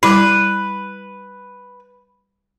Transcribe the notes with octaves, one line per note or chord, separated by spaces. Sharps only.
G3 E4 B4